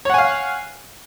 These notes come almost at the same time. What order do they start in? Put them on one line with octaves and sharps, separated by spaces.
C#5 F#5 G#5 F5